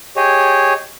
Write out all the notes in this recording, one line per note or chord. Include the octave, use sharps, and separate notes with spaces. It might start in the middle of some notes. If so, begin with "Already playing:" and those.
G4 G#4 C#5 D#5